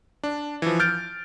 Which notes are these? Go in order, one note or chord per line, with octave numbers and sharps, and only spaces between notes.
D4
E3 F3
F6 G6 A6 D7